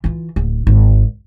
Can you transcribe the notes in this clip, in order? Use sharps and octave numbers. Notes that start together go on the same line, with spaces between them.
E3 F4
D1
G#1